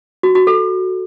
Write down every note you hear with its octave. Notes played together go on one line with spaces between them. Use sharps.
F#4
F#4
A4